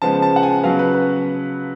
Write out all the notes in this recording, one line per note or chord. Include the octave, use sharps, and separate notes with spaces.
C#3 F3 G#3 B3 A5
A5
F#5
G#5
C#3 F#3 B3 F5
B4
B4